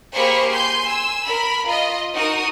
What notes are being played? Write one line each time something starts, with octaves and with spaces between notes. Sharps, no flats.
A#3 G4 G#4 C5 B5 C#6
G#5 C6 G6
G#5 E6
A#4 B5
F4 D#5
D#4 F#4 A#4 D#6